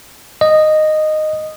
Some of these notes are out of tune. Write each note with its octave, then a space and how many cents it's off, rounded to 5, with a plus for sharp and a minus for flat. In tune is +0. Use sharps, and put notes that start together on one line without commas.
D#5 -10